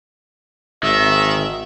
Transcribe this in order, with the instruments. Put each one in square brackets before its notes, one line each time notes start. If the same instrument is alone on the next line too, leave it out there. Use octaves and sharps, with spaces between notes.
[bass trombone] G#1 [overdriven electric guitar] D#3 [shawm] E5